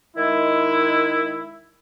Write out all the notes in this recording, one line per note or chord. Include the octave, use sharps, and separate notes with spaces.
D#3 G#3 E4